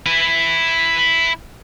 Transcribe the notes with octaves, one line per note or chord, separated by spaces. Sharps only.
E4 B4